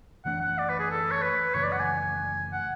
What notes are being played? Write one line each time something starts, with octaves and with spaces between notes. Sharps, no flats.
F#2 E3 A3 D4 F#5
F#5
D5
B4
G#4
A4
C#5
B4
F#2 C#3 E3 A3 C#5
D5
F#5
G#5
F#5